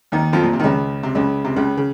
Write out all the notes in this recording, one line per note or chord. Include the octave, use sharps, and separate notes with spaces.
D#2 D#3
F2 F3
A#2
C3
D#3
C#2 C#3
C3
C#2 C#3
C3
C#2 C#3
C#3